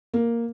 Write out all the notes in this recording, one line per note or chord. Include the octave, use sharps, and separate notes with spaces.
A#3